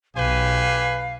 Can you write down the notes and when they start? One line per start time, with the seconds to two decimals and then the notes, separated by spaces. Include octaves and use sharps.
0.16 B1 G4 B4 F5 G#5